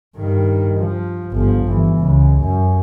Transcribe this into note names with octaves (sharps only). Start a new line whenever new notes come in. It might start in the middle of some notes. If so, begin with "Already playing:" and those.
G2 D#3
F3
G1 F3
G1 E3
C#2
F#2